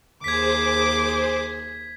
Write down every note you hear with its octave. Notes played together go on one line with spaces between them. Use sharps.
D#2 G#4 C5 D6 G#6 B6